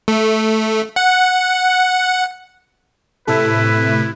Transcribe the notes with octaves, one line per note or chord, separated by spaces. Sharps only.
A3
F#5
A2 C3 E4 A4 B4 E5